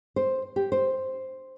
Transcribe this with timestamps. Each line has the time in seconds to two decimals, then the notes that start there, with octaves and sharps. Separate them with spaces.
0.16 C5
0.56 G4
0.72 C5